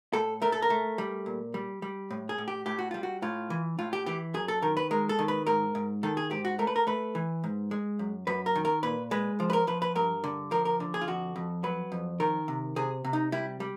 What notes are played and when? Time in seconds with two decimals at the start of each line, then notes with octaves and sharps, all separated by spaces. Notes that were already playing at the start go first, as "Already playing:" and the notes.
0.13 A2 A4
0.42 A3 A#4
0.52 A4
0.62 A#4
0.70 A3
0.98 G3
1.26 A#2
1.54 G3
1.82 G3
2.11 A2
2.29 G#4
2.38 A2
2.48 G4
2.66 A2 G4
2.79 F#4
2.91 G3 F4
3.03 F#4
3.22 A2 F4
3.50 E3
3.79 A2 F4
3.93 G4
4.06 E3 G4
4.34 F#2 G#4
4.48 A4
4.62 D#3 A#4
4.77 B4
4.91 G#3 A#4
5.09 A4
5.19 D#3
5.28 B4
5.47 G#2 A#4
5.75 G#2
6.03 D#3 A4
6.17 G#4
6.31 G#2 G4
6.45 F#4
6.59 A3 A#4
6.67 B4
6.76 A#4
6.87 A3 B4
7.15 E3
7.44 G#2
7.71 G#3
7.99 F#2
8.27 F#2 B4
8.46 A#4
8.55 D#3
8.65 A#4
8.83 A#2 B4
9.11 G#3 B4
9.40 F3
9.50 B4
9.53 A#4
9.67 F3 B4
9.82 B4
9.96 G2 A#4
10.24 D3
10.51 F3 A#4
10.65 A#4
10.80 D3
10.94 G#4
11.01 F4
11.08 F2 F#4
11.36 F2
11.64 F#3 B4
11.92 F2
12.20 D#3 A#4
12.48 C3
12.76 C3 G#4
13.04 C3
13.13 D#4
13.32 G3 E4
13.60 G3